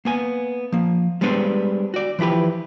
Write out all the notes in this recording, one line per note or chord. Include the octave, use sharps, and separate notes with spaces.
A#3 B3 G#5
F3 A#3
G3 G#3 B3 D4 B4 C5
F#4 D5
E3 F3 E4 G4 B4